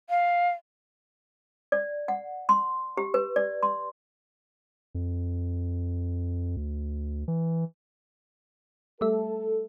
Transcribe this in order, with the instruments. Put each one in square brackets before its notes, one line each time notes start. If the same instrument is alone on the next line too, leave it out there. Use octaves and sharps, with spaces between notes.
[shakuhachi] F5
[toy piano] D5
F#5
C6
G4
B4
D5
C6
[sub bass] F2
D2
E3
[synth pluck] G3 A3 E5 [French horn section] A4